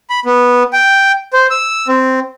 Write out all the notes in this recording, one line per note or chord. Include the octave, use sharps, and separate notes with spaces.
B5
B3
G5
C5
E6
C4